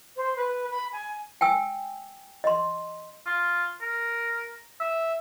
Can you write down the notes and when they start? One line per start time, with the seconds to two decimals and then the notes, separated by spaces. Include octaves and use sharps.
0.17 C5
0.37 B4
0.71 B5
0.93 G#5
1.41 G5 G#5 E6
2.44 D#5 C6
3.26 F4
3.82 A#4
4.81 E5